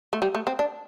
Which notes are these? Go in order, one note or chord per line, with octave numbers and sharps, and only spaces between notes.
A3
G3
A3
C4
D4